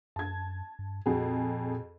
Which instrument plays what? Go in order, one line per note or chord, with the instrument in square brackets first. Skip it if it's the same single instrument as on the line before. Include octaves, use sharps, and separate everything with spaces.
[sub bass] F#2 [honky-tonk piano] A5 G#6
[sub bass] G2
[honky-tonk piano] F2 F#4 G#4 [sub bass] A#2